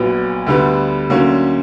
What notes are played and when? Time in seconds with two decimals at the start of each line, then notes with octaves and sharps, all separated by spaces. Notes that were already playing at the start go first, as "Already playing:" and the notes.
Already playing: A#1 A#2 F#3 B3
0.46 D2 D3 G3 B3
1.10 D2 D3 F#3 A#3 C#4